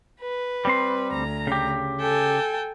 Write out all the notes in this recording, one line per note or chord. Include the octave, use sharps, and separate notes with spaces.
B4
G3 C4 C6
D2 A#5
C#3 G4
A4 G5 G#5